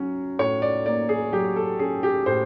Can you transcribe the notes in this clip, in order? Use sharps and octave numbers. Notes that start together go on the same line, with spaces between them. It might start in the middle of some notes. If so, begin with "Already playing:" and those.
Already playing: F#3 C#4
A2 C#5
D5
A#3 D5
G#4
F#3 G4
A4
C#4 G#4
G4
A2 C5